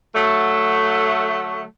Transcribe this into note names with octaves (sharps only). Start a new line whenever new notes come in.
D3 F#3 A3